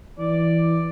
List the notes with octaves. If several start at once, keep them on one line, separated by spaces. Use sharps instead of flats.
E3 D5